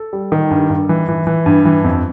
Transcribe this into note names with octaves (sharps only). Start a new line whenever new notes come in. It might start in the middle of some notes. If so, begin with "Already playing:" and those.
Already playing: A4
G3
D#3
G2
G2
E3
E3
E3
G2
E3
F2